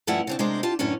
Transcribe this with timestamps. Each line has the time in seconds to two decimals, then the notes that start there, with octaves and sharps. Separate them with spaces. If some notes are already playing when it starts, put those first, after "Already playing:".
0.07 G2 F3 A3 C#4 E4 F#5
0.27 C#3 C4 D4
0.39 C3 G#3 A#3 D4 C5
0.63 F4 G4 A5
0.79 F#2 A2 D3 B3 C#4 D4